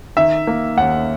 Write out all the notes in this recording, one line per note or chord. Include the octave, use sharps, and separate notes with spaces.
D#3 E5
A#3
D#2 F#5